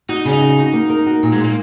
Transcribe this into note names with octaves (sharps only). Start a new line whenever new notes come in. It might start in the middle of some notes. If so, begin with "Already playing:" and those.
D#4 F#4
C#3 C#4
D#4
F#4
F#4
A#3
A#4
F#4
A#2
G#3
A#2
A#3